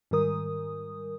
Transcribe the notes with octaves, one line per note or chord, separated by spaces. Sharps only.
G#2 D#3 G3 A#4 D#6